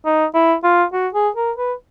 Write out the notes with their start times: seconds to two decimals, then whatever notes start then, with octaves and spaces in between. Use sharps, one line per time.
0.05 D#4
0.34 E4
0.64 F4
0.93 F#4
1.14 G#4
1.36 A#4
1.58 B4